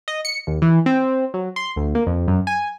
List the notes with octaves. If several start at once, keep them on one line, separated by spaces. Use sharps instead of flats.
D#5
C#7
D#2
E3
C4
F#3
C6
D2
A#3
F2
F#2
G#5